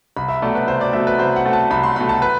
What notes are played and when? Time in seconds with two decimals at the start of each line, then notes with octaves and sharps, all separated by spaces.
0.17 C2 B5
0.29 E5
0.42 B2 F#3 A3 D5
0.55 B4
0.68 C2 C5
0.81 D5
0.93 B2 F#3 A3 E5
1.07 B4
1.19 C2 C5
1.36 F#5
1.45 B2 F#3 A3
1.53 A5
1.71 C2 B5
1.83 C6
1.96 B2 F#3 A3 B5
2.09 A5
2.22 B4